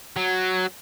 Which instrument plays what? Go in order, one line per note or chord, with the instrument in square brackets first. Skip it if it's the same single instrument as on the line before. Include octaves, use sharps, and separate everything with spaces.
[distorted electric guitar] F#3